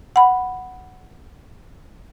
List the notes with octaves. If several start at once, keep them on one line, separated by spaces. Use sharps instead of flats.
F#5 B5